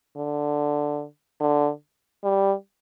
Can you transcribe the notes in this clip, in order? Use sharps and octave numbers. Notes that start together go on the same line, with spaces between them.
D3
D3
G3